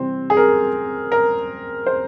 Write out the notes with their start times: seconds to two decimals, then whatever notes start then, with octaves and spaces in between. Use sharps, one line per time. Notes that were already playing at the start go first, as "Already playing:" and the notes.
Already playing: C3 E3 G3 C4
0.30 G#4
0.37 A#4
1.12 A#4
1.86 C5